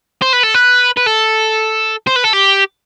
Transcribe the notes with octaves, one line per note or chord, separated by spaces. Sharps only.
C5
B4
A4
B4
B4
A4
C5
B4
A4
G4